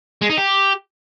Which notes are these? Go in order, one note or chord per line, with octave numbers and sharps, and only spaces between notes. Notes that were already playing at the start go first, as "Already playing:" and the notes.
G#3
D#4
G4